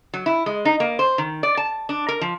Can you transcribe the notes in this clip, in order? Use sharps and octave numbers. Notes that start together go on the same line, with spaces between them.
F#3
E4
G#3
D#4
A#3
C5
D#3
D5
A5
D4
A#4
F3